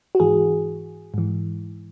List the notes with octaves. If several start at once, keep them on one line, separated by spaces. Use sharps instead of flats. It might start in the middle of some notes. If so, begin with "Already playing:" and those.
F#4
G#2 E3 G#4
G#2 E3